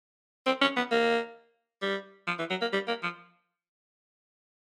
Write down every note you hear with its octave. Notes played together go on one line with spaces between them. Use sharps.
C4
C#4
B3
A#3
G3
F3
E3
F#3
A#3
G3
A#3
F3